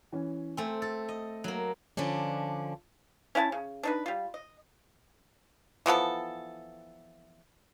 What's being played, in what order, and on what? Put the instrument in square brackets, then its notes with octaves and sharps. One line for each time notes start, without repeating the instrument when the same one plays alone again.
[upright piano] E3 C#4
[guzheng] A3 C4 [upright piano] G#5
[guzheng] A4 [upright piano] A6
[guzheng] D#5
F#3 A#3
[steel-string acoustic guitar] D3 F3 C#4 D4
[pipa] C#4 E4 F5 A5
C#3
D4 D#4 B4
G3 F4
D#5
E3 F3 B3 A4